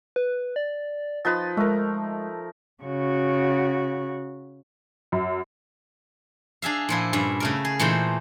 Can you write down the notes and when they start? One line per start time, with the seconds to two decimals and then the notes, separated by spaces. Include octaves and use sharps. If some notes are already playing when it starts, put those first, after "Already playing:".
0.16 B4
0.56 D5
1.25 F3 D#4 B4 A6
1.57 G#3 A3 A#4
2.83 C#3 F#4
5.12 F#2
6.62 D4 G#4 E5 F5
6.89 A#2 F3 E4
7.13 G2 C#4 E5
7.40 C#3 A3 A#4
7.65 G#4
7.79 A#2 E3 A3 D#4 C5